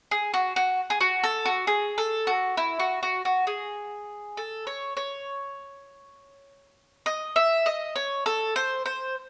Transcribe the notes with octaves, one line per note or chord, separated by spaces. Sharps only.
G#4
F#4
F#4
G#4
F#4
A4
F#4
G#4
A4
F#4
E4
F#4
F#4
F#4
G#4
A4
C#5
C#5
D#5
E5
D#5
C#5
A4
C5
C5